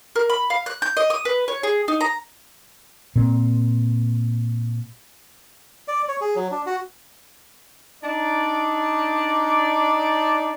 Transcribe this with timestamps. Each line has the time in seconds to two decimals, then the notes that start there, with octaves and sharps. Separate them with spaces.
0.16 A#4
0.30 B5
0.50 F5
0.66 F#6
0.82 G6
0.97 D#5
1.10 D#6
1.25 B4
1.48 C#5
1.63 G#4
1.88 D#4
2.01 A#5
3.16 A#2 C4
5.88 D5
6.08 C#5
6.21 G#4
6.35 F#3
6.51 D4
6.66 F#4
8.03 D4 D#4 D5